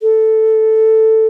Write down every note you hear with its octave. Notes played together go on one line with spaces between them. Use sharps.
A4